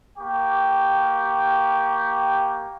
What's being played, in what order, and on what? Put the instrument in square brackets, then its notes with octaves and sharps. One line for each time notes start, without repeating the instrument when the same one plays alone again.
[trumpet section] A#3 G4 G5 C#6